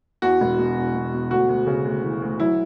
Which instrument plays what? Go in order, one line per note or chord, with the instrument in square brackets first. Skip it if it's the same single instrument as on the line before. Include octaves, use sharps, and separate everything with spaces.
[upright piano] E2 F#4
E1
B2
E2
B2
B2
D2 F#4
D2
C#3
D2
E3
D2
F#3 E4